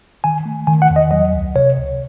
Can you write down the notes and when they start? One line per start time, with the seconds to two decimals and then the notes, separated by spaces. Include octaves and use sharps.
0.24 D#3 G#5
0.46 A3
0.67 D#3 G#5
0.82 F#5
0.90 E2
0.96 D#5
1.11 F#3 D#5
1.33 C#2
1.55 C3 C#5
1.77 C#2